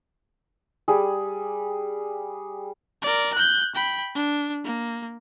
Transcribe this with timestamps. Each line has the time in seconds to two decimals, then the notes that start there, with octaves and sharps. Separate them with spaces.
0.88 G3 G#4
3.02 A#4 D5
3.34 F#6 G6
3.75 G5 B5
4.15 D4
4.64 A#3